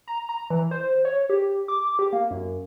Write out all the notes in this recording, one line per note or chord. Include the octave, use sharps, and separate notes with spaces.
A#5
A#5
E3
C5
C#5
G4
D6
G4
A#3
F#2